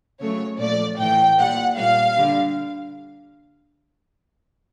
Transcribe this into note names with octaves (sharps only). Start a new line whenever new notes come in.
C#3 F#3 A3 C#5
A#2 F3 A3 D5
A2 E3 A3 G5
A#2 G3 F#5
A#2 G3 F5
D3 G3